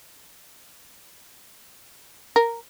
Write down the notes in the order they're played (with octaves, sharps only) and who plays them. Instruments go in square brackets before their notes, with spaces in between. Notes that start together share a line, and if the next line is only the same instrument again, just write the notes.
[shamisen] A#4